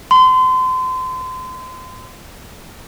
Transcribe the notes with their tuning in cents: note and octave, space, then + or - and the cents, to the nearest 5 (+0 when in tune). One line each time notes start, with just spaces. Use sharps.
C6 -35